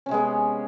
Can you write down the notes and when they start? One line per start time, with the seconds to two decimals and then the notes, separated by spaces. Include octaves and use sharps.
0.06 C#4
0.09 C3
0.11 G#3
0.14 B3